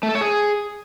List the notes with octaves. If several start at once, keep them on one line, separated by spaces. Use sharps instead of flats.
A3
A4
C#5
G#4